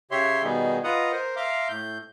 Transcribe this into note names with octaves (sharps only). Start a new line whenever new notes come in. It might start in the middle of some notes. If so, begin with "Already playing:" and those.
C#3 G4 C#5 E5 C6
B2 D#3 G3 B3 D#4 G#4
F4 B4 D#5 F#5 A#5 D#6
A#4 C5
E5 F5 A#5 C6 D6
A2 G6